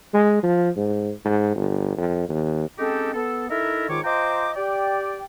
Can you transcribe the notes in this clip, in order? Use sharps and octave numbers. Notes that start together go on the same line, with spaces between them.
G#3
F3
G#2
G#2
G1
F2
D#2
G#3 C4 C#4 D#4 G4 A4
B3 A4
D#4 E4 A4 A#4 E5
G#2 D#3 F4 C#5 C#6 D6
F4 C5 D#5 G5 A#5 D6
G4 D5 G5